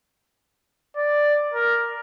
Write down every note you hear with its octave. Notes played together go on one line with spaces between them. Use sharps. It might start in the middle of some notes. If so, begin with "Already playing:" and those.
D5
A#4